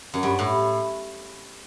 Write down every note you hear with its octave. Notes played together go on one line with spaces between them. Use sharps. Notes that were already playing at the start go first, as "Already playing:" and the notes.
F#2
G2
A2